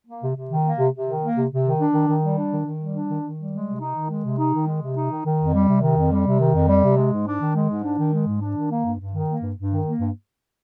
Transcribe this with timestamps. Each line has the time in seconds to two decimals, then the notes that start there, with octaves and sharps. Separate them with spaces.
0.06 A#3
0.22 C3
0.35 C3
0.50 D#3
0.64 A#3
0.79 C3
0.93 C3
1.07 D#3
1.22 A#3
1.36 C3
1.51 C3
1.65 D#3
1.80 D4
1.94 D#3
2.07 D#3
2.23 G3
2.37 D4
2.51 D#3
2.65 D#3
2.80 G3
2.94 D4
3.09 D#3
3.23 D#3
3.38 G3
3.52 G#3
3.66 C3
3.81 D#4
3.95 D#3
4.10 G#3
4.24 C3
4.38 D#4
4.53 D#3
4.67 G#3
4.81 C3
4.96 D#4
5.10 D#3
5.25 D#3
5.39 F2
5.54 G3
5.67 C3
5.82 D#3
5.96 F2
6.11 G3
6.25 C3
6.40 D#3
6.54 F2
6.68 G3
6.83 C3
6.98 G#3
7.12 G#2
7.27 D4
7.40 D#3
7.55 G#3
7.70 G#2
7.84 D4
7.97 D#3
8.13 G#3
8.26 G#2
8.41 D4
8.55 D#3
8.70 A#3
8.84 G2
8.99 G2
9.13 D#3
9.28 A#3
9.42 G2
9.56 G2
9.70 D#3
9.86 A#3
9.99 G2